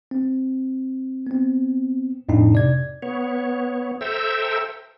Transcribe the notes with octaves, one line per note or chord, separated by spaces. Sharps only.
C4
B3 C4
F2 A2 D4 D#4
C3 D5 G#6
B3 C#5
A4 C5 E5 G5 A#5 E6